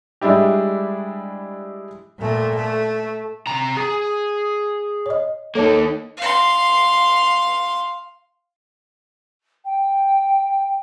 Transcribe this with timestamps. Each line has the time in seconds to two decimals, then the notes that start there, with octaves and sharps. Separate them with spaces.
0.21 G3 G#3 D4 E4 G4
2.19 A#2 A3
2.55 A3
3.47 C3 A#5
3.77 G#4
5.06 C#5 D#5
5.55 A#3 D#4 A4 C#5 A5
6.17 F5 C6
9.65 G5